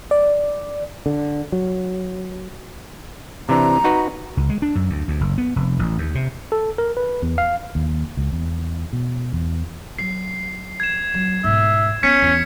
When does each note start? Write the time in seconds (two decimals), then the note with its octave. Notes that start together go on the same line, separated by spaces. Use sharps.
0.11 D5
1.06 D3
1.52 F#3
3.49 C3 E3 D4 A#5
3.84 D#4 F#4 B4
4.37 C#2
4.50 G#3
4.62 D4
4.75 F#2
4.90 D2
5.08 D2
5.21 F#1
5.38 B3
5.56 F1
5.79 A1
5.98 D#2
6.15 C3
6.52 A4
6.78 A#4
6.97 B4
7.22 E2
7.38 F5
7.75 D#2
8.17 C#2
8.32 E2
8.93 B2
9.33 E2
9.99 F#3 C7
10.80 G#6 E7
11.14 F#3
11.44 G#2 B2 E5
12.03 B3 C#4 G#6 B6 C#7
12.22 E2 E3